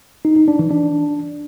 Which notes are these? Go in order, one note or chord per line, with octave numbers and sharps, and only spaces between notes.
D#4
D#4
D4
E3
D4